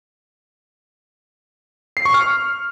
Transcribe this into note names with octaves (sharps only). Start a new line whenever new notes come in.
C7
C#6
F6